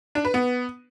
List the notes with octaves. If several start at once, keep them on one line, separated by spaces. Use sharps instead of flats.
D4
B4
B3